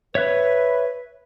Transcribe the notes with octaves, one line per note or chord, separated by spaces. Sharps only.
B4 C#5 E5 F#6